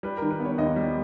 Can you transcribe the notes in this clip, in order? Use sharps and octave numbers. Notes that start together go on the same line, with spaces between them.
G3 B4
A#4
D#3
B4
B3
C#5
D#2 D#5
G3